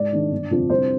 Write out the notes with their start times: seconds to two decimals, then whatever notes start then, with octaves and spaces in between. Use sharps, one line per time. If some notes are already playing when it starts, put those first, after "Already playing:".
Already playing: G#2 D5
0.12 D#3 G#3 D4
0.31 G1
0.51 F2 D3 F3
0.70 C2 C5